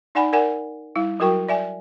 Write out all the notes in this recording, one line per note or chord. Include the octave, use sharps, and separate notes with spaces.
D#4 D5 F#5 G#5 B5
A#4 D5 F#5 G#5
G3 E4 F5
F#3 F#4 A#4 G5 C#6
D5 E5 G#5